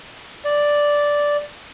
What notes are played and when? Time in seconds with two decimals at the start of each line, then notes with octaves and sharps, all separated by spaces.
0.45 D5